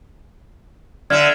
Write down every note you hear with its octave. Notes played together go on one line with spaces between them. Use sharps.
D3 D5 E5 F6 G#6